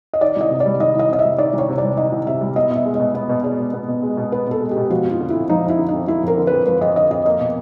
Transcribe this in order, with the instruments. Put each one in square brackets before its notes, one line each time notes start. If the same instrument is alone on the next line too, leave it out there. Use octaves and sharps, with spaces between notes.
[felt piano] D#5
[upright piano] D#3 [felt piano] D5
[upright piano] C2 [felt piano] D#5
[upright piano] C3
[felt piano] D5
[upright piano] G3
[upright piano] D#3 [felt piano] D#5
[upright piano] C2 [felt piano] D#5
[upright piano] C3 [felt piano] D#5
[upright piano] G3 [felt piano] E5
[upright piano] D#3 [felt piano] D5
[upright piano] C2 [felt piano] C#5
[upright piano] C3
[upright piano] G3 [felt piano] D5
[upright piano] D#3 [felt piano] D#5
[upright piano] C2
[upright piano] C3 [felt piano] E5
[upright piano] G3
[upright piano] B3 [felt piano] D#5
[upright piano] B2
[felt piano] E5
[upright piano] G#3
[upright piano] B2 [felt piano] D#5
[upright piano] B3 [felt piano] D#5
[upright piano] B2
[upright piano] G#3 [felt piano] D5
[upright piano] B2
B3
B2
G#3
B2
[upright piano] B3 [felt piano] B4
[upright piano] B2 [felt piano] A4
[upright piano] G#3
[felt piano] G4
[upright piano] B2
[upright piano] F3 [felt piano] F#4
[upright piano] F2
[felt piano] F4
[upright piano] D3
[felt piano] E4
[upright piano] F2
[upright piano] F3 [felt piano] D#4
[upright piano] F2
[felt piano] E4
[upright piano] D3
[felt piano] D#4
[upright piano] F2
[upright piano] F3 [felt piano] E4
[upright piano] F2 [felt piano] A#4
[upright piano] D3
[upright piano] F2 [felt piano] B4
[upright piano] F3 [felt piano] B4
[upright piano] F2 [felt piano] D#5
[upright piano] D3 [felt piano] D#5
[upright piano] F2 [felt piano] D#5
[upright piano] A#3 [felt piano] D#5
[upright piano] B2